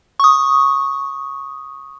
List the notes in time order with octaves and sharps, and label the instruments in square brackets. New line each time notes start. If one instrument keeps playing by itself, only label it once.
[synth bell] C#6 D#6